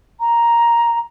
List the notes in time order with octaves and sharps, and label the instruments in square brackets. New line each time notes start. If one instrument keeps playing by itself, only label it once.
[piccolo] A#5